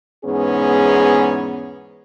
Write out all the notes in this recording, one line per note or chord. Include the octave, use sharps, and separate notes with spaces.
E2 G#2 B3 C#4 G#4